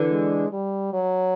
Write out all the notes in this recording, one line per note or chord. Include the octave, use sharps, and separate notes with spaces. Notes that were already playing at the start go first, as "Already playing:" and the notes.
Already playing: D3 E3
G#3
G3
F#3